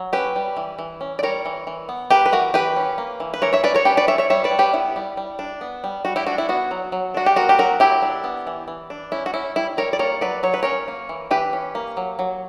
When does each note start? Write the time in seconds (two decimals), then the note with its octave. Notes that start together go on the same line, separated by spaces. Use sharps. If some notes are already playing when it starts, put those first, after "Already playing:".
Already playing: F#3
0.13 C#4 G4 B4
0.36 G3
0.57 E3
0.79 E3
1.01 C#4
1.19 D5
1.23 G3 A#4 C#5
1.45 E3
1.67 E3
1.89 B3
2.10 A#3 G4 B4
2.26 B4
2.32 E3 F#4 A#4
2.54 E3 G4 B4
2.76 C#4
2.98 A#3
3.20 E3
3.34 B4
3.42 E3 A#4 C#5
3.53 C#5 E5
3.63 C#4 B4 D5
3.74 A#4 C#5
3.85 C#4 G4 B4
3.97 B4 D5
4.08 C#4 C#5 E5
4.18 C#5 E5
4.30 G3 C#5 E5
4.44 B4 D5
4.51 G3
4.59 G4 B4
4.74 B3 E4
4.96 G3
5.17 G3
5.39 D4
5.61 B3
5.84 G3
6.05 G3 F#4
6.16 E4 G4
6.27 D4 F#4
6.38 E4
6.49 B3 F#4
6.71 F#3
6.92 F#3
7.14 D4 F#4
7.26 G4
7.36 B3 F#4 A#4
7.49 G4
7.58 F#3 F#4 A#4
7.80 F#3 E4 G4
8.02 D4
8.24 B3
8.47 E3
8.68 E3
8.90 D4
9.12 C#4 E4
9.26 F#4
9.34 C#4 E4
9.56 G3 E4
9.77 G3 A#4 C#5
9.93 D5
9.99 A#3 A#4 C#5
10.21 F#3 B4 D5
10.43 F#3 C#5
10.54 B4
10.63 C#4 A#4 C#5
10.88 A#3
11.09 E3
11.31 E3 G4 B4
11.53 C#4
11.75 A#3
11.97 F#3
12.19 F#3